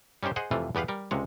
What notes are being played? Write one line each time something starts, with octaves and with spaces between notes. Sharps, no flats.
G3 C#4 D#4 G4 C5
G#4 C5 D#5 F#5
F2 C3 E3 A3 F4
E2 B3 G4 B4 F5
G3 A#4
C#2 C3 G#3 C#5